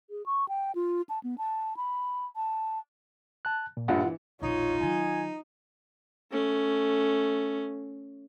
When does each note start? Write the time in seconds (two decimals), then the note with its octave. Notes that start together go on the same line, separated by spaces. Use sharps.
0.10 G#4
0.26 C#6
0.49 G5
0.75 F4
1.09 A5
1.23 B3
1.38 A5
1.77 B5
2.36 A5
3.45 A5 F#6
3.77 A#2
3.88 A#1 G2 F4 F#5
4.04 E3
4.42 E1 A#1 D#4 F4 C#5
4.80 D#3 F#3 G#5
6.31 A3 C#4